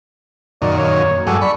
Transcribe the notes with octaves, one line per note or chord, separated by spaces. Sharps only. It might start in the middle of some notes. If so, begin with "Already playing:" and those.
F#2 A#2 D#3 D5
C#5
G2 F#3 G#3 A4
D5 B5 C#6